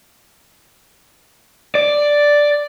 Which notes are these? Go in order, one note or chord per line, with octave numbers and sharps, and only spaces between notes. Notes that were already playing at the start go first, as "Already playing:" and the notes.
D5